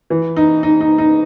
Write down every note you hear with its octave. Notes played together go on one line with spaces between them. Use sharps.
E3
D#4
D#4
D#4
D#4